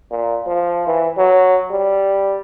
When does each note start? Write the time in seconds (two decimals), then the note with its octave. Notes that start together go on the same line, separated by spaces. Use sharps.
0.11 A#2
0.47 F3
0.87 E3
1.17 F#3
1.71 G3